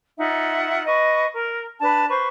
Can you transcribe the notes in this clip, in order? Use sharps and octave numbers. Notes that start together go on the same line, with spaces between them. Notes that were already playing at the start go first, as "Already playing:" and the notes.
D#4 F4 E5 F#5
B4 D#5 C#6
A#4
D4 B4 A5
B4 C5 C#6